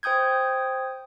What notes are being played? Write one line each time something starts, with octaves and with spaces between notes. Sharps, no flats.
C5 G5 D#6 G6 G#6